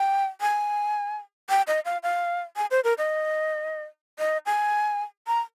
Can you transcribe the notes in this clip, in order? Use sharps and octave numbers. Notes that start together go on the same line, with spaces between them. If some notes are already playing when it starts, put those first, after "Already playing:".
Already playing: G5
G#5
G5
D#5
F5
F5
G#5
C5
A#4
D#5
D#5
G#5
A#5